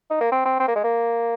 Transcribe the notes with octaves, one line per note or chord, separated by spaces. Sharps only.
D#4
A#3
C4
C4
C4
A#3
G#3
A#3